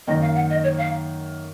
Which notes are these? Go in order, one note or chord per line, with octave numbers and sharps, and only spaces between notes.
F#2 D#3 A#3 D#5
F5
F#5
D#5
C#5
F5